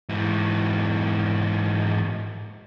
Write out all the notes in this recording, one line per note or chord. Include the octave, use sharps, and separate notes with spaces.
G#2 E3